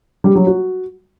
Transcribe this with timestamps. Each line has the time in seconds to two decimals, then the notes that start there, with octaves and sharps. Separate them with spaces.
0.24 G3
0.35 F#3
0.47 F#4